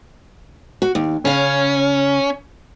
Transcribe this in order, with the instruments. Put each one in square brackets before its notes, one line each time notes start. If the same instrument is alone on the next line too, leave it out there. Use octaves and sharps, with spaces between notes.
[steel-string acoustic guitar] F#4
D#2
[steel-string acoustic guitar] C#3 F5 [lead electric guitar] C#4